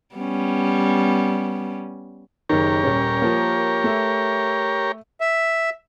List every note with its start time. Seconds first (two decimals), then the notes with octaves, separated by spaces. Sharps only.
0.15 G3 B3 C#4
2.49 F#1 D#3 G4 A#4 C#5
2.84 D#1 C#4
3.22 F3 A#3
3.84 A3 E5
5.21 E5